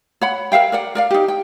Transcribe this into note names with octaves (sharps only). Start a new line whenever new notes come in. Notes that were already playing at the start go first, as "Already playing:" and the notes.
C#5 F#5 B5
A#4 E5 F5 G5
A#4 D5 F#5
A#4 D5 F5
D#4 G4
G5